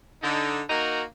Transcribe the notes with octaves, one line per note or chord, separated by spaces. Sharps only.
D3 D#4
A#3 D#4 F#4 A#4